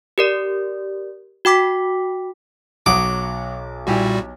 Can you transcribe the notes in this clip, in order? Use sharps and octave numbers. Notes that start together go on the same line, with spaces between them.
G4 A#4 D5
F#4 G5 D6 B6
B1 F#3 F#5 D6 D#6
A#2 G3 E4 F#4 G4 G#5